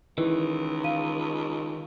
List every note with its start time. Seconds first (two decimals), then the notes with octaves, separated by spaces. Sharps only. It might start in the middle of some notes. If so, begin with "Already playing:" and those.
0.18 C#2 D#3 E3
0.84 F5 D#7